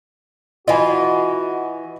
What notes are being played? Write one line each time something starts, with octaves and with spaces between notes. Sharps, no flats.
E3 F4 F#4 D#5 G#5